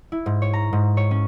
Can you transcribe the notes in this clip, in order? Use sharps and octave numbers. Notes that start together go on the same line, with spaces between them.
E4
G#2
C#5
A#5
G#2
C#5
C#4